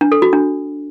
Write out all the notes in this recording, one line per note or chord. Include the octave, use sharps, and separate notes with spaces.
D4
A4
F#4
D4